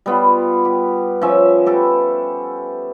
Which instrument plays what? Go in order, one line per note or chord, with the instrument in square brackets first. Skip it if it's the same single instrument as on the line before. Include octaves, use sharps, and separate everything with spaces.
[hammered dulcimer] G3 B3 F4
G4
F3 C#4 E5
G4 A4 B4